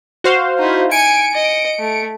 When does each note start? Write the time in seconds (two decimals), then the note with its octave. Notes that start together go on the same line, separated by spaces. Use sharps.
0.24 F#4 C5 F5
0.59 D#4 E4
0.91 G#5 C#7 D7
1.34 D#5
1.80 A3